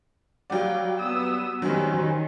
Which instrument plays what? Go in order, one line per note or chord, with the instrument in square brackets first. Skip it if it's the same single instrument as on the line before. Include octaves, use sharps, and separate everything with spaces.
[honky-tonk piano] F#3 G3 D5 [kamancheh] F5 G5
[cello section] B3 [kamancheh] D#6 E6
[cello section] D#3 [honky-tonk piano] F#3 G3 [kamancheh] C#4 C5
[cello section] D#3